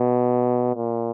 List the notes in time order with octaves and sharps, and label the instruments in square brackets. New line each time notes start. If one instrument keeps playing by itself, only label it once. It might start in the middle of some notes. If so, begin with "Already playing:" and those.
Already playing: [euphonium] B2
A#2